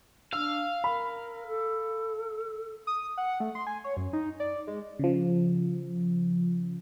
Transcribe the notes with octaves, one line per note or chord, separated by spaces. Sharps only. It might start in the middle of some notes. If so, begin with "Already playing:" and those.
D4 F5 E6
A#4 B5
A4
D#6
F#5
A3
C6
G#5
C#5
F#2
D#4
D5
G#3
C#3 F3